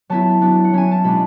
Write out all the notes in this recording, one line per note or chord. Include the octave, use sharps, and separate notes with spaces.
F#3 B3 E4 A5
F#3 B3 D4
F#5
F#3 C#4 E4 G#5
A5
B2 G#3 D4 B5